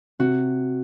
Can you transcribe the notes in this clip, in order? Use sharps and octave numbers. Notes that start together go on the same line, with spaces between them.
C3 F#4